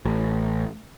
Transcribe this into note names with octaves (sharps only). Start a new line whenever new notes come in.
A1